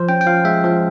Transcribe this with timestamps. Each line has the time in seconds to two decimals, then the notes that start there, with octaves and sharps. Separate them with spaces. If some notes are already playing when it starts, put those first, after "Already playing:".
Already playing: F3 C5
0.09 C#4 G5
0.21 G5
0.26 F3 F5
0.45 G#3 E5
0.64 F3